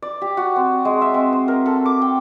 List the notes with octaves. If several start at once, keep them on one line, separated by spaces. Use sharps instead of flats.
D5
G4
F#4
C4
G#3
E5
C4
C5
A#4
A4
D6
G5